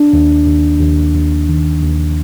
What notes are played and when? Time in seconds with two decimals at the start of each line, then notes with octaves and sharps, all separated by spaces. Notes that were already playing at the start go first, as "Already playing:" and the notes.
Already playing: D4
0.13 D#2
0.47 D#2
0.80 D#2
1.14 D#2
1.49 D#3
1.83 D#2